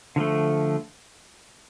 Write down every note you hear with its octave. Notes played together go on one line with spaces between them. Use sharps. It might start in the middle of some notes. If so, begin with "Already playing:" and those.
D3 F3 A3